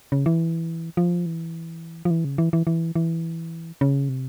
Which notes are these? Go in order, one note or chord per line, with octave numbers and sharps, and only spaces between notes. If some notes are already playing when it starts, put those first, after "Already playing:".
C#3
E3
F3
E3
F3
E3
C#3
E3
E3
E3
E3
C#3
C3